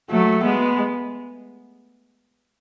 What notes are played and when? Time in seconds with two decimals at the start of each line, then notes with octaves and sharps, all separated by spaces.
0.10 F#3 A3
0.44 G#3 B3